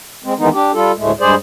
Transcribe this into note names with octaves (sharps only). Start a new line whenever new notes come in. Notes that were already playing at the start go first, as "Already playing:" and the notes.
G#3 C4
D#3 E3 G#3 B3 D#4
D4 G4
G3 F4 A4
D2 A2 G#3 A3
G2 G3 G#3 G#4 C5 D5